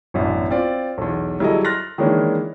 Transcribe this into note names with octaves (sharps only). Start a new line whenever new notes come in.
A1 F#2 B2 D4
C4 F4 D5
B1 E2
F#3 G3 E4 G#4 A4 D#5
C6 F6 F#6 A6 A#6
D#3 E3 G#3 A#3 C#4 D4